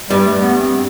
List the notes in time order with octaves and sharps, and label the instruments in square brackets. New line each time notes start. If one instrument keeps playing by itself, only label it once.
[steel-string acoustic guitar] G2 [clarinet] G3
[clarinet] A3
B3
C4